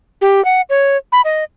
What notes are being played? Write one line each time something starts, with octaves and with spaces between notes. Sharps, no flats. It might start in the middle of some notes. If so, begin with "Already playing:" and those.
G4
F#5
C#5
B5
D#5